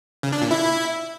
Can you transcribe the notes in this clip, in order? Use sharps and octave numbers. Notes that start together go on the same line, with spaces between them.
C#3
D4
A#2
E4